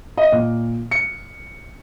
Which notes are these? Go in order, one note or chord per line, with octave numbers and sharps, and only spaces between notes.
D#5
A#2
C#7